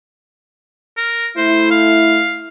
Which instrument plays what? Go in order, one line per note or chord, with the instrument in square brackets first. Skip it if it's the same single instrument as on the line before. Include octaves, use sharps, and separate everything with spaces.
[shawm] A#4
[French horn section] A3 E4 [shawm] C5
[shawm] F5